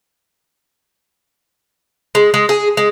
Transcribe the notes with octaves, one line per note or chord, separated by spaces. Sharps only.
G#3
G#3
G#4
G#3